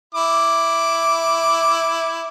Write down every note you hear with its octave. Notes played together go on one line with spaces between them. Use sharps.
E4 D6